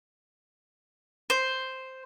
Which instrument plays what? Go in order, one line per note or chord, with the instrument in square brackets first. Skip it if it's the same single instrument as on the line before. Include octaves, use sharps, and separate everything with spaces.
[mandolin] C5